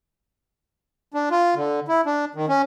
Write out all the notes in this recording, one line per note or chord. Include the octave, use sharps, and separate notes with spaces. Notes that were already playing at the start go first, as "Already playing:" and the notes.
D4
F4
D3
E4
D4
D#3
C#4